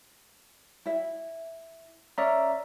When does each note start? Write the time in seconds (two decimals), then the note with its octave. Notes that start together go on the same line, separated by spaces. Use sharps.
0.86 E4 E5
2.18 C#4 D5 E5 A#5